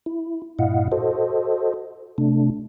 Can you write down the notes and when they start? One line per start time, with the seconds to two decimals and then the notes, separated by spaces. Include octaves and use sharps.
0.06 E4
0.59 G2 A#2 E4 D#5 F5 F#5
0.92 F#4 A4 C5 D#5
2.18 C3 A3 D4